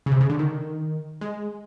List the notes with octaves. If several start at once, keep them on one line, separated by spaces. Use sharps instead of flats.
C#3
C3
C#3
D3
D#3
G#3